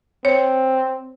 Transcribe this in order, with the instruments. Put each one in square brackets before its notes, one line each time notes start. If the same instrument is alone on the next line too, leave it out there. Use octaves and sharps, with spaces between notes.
[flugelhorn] C4 [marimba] C5 C#5